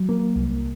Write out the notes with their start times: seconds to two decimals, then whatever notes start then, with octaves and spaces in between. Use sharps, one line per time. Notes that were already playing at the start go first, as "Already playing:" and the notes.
Already playing: F#3
0.09 A#3
0.36 C2